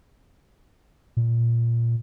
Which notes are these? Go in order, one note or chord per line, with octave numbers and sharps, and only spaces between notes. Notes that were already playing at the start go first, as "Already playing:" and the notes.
A#2